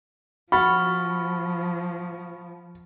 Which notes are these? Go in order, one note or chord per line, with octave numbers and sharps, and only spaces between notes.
F3 F#4 B5 C#6 F6 A6